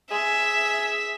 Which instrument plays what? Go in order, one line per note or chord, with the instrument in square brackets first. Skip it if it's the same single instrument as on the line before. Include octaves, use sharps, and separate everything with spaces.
[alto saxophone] G#4 [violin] E5